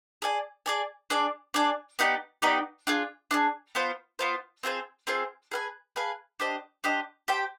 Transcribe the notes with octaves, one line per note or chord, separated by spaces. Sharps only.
G#4 D5 G#5
G#4 D5 G#5
D4 G#4 D5
D4 G#4 D5
B3 D#4 G4 D5
B3 D#4 G4 D5
D4 F4 G#4
D4 F4 G#4
B3 F4 C5
B3 F4 C5
C4 F4 G#4 C5
C4 F4 G#4 C5
G#4 B4 F5 G#5
G#4 B4 F5 G#5
D4 G4 C5 D#5
D4 G4 C5 D#5
G4 C5 G5